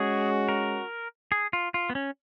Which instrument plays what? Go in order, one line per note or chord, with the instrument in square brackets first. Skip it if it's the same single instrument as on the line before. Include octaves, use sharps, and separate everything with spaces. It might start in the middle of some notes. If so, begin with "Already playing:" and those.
Already playing: [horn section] G#3 C#4 F#4 [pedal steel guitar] G#4
[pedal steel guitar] A#4
G#4
F4
F4
B3
C#4